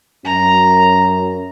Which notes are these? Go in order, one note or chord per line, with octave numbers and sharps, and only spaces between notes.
F#2 A#5